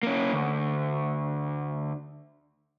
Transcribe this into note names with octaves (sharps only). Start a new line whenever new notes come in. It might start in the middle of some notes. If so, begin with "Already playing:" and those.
A#3 C#4
D2